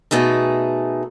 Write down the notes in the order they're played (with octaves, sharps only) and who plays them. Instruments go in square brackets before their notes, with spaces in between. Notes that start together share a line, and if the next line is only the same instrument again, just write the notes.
[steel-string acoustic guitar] B2 A3 D#4 G#4